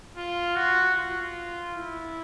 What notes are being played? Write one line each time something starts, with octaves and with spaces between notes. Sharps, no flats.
F4
F#4
F4
E4